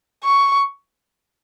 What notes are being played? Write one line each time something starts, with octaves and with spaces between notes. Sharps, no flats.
C#6